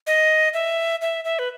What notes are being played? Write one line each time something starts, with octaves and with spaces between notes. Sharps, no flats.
D#5
E5
E5
E5
B4